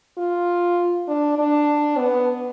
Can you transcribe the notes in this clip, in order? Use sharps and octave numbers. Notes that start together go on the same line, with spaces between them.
F4
D4
D4
B3